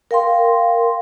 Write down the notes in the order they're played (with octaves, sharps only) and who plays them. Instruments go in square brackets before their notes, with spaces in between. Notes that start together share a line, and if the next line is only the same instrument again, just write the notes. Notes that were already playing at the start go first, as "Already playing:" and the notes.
[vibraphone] A#4 F5 G5 C6